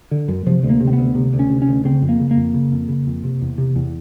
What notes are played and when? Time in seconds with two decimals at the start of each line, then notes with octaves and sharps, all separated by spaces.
0.11 D3
0.28 F#2
0.46 C3 F3
0.63 D2
0.70 A#3
0.80 C3
0.87 C4
0.93 B3
0.99 D2
1.15 C3
1.34 D2
1.39 C#4
1.50 C3
1.62 C#4
1.68 D2
1.85 C#3 C4
2.02 F2
2.09 A#3
2.20 C#3
2.31 A#3
2.37 F2
2.54 C#3
2.72 F2
2.88 C#3
3.07 F2
3.24 C3
3.42 E2
3.58 C3
3.76 E2